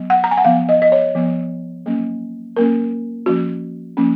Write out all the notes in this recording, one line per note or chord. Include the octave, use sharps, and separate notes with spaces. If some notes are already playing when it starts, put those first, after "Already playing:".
Already playing: F#3 B3
F#5
A#5
G#5
F#5
F3 B3 F5
D#5
D#5
C#5
F3 B3
F#3 A#3 C#4
F#3 A#3 C#4 A#4
F3 A#3 C#4 F#4
F3 A#3 C#4